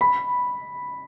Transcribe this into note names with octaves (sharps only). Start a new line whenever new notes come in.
B5